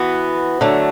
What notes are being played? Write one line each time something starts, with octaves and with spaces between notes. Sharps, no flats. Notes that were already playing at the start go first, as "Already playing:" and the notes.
Already playing: E3 B3 F#4
D3 F#3 A3